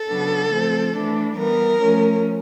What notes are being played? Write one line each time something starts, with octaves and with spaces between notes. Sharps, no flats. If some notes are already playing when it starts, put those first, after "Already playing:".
Already playing: A4
C#3 F#3 B3 D4
F3 A3 C4
E3 A3 D4
E3 G3 B3 A#4
F3 A3 C#4